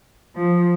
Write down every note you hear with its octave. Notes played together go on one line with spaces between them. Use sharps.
F3